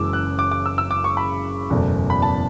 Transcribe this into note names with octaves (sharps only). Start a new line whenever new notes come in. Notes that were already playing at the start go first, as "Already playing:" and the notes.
Already playing: F#1 F#2 E3 G#3 D6 E6
F#6
D6
D6
E6
E6
D6
C#6
B5
F#1 E2 B2 A3
B5
A5